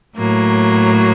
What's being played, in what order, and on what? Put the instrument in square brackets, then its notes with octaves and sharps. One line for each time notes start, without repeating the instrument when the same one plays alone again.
[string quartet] A2 F#3 A#3